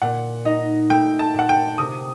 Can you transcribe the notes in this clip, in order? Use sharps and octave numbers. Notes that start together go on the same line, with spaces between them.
A#2 F#5
D#4 D#5
A3 G5
A5
A#2 F#5
G5
C3 D#6